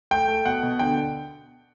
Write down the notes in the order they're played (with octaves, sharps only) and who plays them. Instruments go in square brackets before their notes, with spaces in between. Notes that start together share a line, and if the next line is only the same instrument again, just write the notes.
[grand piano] A3 G5
A3
B2 F#5
B2
D3 G5